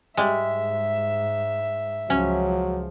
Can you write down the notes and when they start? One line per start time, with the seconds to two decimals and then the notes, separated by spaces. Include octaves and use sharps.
0.17 G#2 G3 G#3 E5
2.10 C#2 F3 F#3 C#4